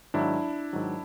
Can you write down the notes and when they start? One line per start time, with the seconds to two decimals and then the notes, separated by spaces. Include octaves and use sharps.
0.14 G#2 D#3 F#3 D4 E4
0.73 G#2 D#3 F#3